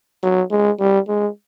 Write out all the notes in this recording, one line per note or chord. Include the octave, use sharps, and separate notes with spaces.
F#3
G#3
G3
G#3